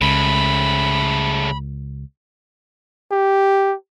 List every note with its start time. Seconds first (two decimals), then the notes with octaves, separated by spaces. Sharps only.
0.01 C#2 C#3 A3 B5
3.11 G4